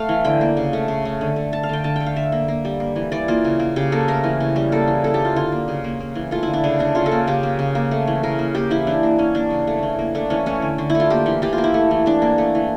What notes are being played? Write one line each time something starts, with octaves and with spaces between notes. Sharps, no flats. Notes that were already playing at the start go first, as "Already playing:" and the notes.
Already playing: A3 F5
E3
D3 G5
A#3
C#3
A3
C#3
A3
D3
A3
A3 A5
F5
D3 G5
D3 A5
A3 G5
F5
D3 E5
A#3
A#3
G3
A#3
E3
E3 D5
A#3 F4
C#3
A#3
C#3 G4
A#3 A4
A3 A#4
E3
C#3
G3
A#3 A4
E3
A#3 A4
G4
E3
F4
D3 F4
A#3
C#3
A#3
A#3
E3
A3 F4
D3 E4
D4
C#3 D4
A3 D4
C#3 F4
A4
A#3
C#3 G4
A#3
C#3
A#3
A3
E3
C#3 A#4
A#3
A#3 G4
E3 E4
E3 D4
A#3
E3 C#4
A#3 D4
C#3
A3
E3
A#3
A3 D4
E3 C#4
A3 C#4
D3
D3
E4
A3
F4
A#3 G4
E3
E3 G4
F4
A#3
E4
A3
E3
E3 D4
A#3
A3
E3